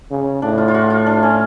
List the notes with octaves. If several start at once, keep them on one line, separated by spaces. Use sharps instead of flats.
C#3
A2 D4
F4
F4
F#4
F4
D4
C#4